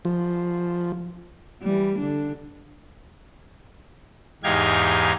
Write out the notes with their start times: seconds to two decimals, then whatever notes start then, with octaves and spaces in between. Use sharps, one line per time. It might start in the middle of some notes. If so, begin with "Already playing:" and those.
0.05 F3
1.62 E3 G3
1.99 D3 D4
4.44 E2 G#2 D#4 G4 F5 G#6